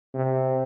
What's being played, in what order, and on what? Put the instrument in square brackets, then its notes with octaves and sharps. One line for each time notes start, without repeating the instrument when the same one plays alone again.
[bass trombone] C3